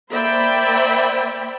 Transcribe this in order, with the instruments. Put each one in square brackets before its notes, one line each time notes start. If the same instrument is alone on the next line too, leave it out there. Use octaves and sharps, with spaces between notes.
[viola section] A#3 C5 D5 E5 G5 B5